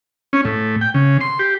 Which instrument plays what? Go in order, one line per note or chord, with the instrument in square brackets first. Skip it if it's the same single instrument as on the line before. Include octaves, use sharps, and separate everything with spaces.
[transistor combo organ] C#4
A2
G5
C#3
C6
G4